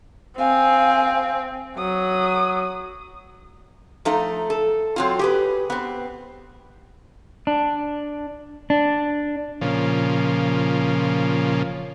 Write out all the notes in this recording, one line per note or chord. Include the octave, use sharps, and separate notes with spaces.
C4 F5 G#5
F#3 D#6
F3 A3 D#4 A#5
A4
F#3 C4 F4
G4 G#4 B4
B3 C4
D4
D4
A#2 C#3 F3